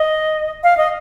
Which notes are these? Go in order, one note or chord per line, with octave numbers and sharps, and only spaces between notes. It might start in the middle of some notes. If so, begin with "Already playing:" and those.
Already playing: D#5
F5
D#5